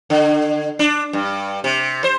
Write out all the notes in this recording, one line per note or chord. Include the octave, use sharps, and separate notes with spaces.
D3
D4
G2
C3
C5